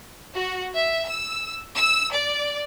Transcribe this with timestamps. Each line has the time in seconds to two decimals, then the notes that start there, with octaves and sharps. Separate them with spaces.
0.34 F#4
0.74 E5
1.07 E6
1.76 E6
2.13 D5